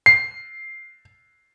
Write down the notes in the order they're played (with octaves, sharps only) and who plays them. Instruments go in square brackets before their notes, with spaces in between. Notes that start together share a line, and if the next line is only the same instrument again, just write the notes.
[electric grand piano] C7